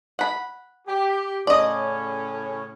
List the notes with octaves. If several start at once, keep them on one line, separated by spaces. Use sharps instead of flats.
F#5 B5
G4
A2 C#3 C#4 D5 D#5